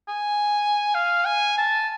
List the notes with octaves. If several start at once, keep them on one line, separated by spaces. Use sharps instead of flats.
G#5
F5
G#5
A5